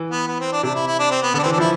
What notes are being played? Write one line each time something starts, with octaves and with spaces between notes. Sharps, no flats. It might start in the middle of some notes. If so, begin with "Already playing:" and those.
Already playing: E3
B3
B3
C4
D4
C3 D4
E4
E4
D4
C4
B3
D3 B3 D4
E3 C4
D4
F3
E4